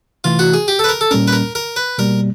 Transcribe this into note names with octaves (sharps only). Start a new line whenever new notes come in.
C3 E3 A3 F4
F#4
G#4
G4
A4
B4
A#4
A4
A#2 G3 A#3 C#4 A#4
B4
A#4
A#4
B4
B2 G3 A#3 A#4